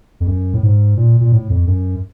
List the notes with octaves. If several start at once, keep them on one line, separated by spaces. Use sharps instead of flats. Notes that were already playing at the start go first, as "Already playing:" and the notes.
F2
F#2
A2
G#2
A#2
A#2
A2
F2
F#2